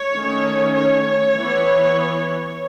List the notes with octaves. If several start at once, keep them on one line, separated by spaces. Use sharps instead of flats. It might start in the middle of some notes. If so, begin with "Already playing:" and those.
Already playing: C#5
D#3 A3 C#4
C#5
E3 B3